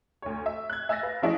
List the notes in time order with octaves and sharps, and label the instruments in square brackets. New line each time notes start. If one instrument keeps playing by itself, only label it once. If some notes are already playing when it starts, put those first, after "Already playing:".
[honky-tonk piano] D2 C#5
E5
F#6 G#6
E5 G#5 E6 A6 A#6
B4 F5
F3 C#4 E4 G#4 D5 D#5